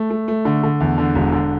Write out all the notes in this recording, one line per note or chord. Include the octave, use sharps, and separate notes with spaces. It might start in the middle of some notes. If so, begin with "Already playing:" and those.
Already playing: A3
A3
A3
D3
D3
E2
D3
E1
D3